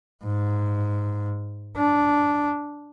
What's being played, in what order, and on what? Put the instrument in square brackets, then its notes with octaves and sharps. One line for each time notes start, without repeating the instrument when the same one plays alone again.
[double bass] G#2
D4